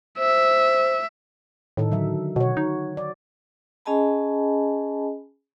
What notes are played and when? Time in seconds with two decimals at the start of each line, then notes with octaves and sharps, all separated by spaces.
0.19 C5 E5
1.77 A2 D#3 D#4 A4
1.92 D3 F#3 E5
2.36 B2 F#4 C#5
2.57 D#4
2.97 D5
3.86 C#4 G#4 D#5 G#5 A5 B5